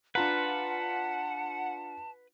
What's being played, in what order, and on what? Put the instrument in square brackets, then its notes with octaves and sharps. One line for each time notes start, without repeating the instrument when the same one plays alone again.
[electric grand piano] D4 F4 A#5 [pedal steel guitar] B4 [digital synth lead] F#5 [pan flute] A5